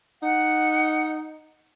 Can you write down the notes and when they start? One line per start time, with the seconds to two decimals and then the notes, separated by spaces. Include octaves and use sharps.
0.22 D#4 F#5